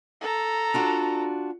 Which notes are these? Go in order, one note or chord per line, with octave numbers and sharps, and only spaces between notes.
A4 A#5
D4 F4 F#4